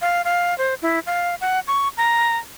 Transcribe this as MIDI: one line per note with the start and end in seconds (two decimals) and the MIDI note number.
0.02 0.22 77
0.25 0.57 77
0.58 0.74 72
0.82 0.99 64
1.06 1.35 77
1.41 1.60 78
1.67 1.88 85
1.97 2.37 82